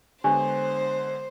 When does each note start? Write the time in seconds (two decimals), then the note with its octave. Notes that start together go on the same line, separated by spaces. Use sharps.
0.24 D3 G#3 B3 D4 G4 C5 C#5